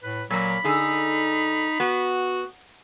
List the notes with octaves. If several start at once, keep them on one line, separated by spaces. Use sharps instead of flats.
A2 B4
A#2 F#3 A#3 B5
D3 D#4 G#4
B3 F#4